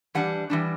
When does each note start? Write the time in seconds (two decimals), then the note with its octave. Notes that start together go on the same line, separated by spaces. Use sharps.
0.15 E3 G3 D4 F#5
0.50 E3 G3 D4